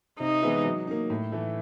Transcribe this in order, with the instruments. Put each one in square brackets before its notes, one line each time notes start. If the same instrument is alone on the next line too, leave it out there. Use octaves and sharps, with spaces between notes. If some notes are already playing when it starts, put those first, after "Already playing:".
[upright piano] C3 [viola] D#4
[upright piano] E3 G#3 B3 E4
F#3
A#3 D#4
A2
E3 A3